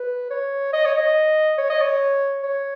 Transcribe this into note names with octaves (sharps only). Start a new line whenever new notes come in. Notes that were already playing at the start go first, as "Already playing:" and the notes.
Already playing: B4
C#5
D#5
C#5
D#5
C#5
D#5
C#5
C#5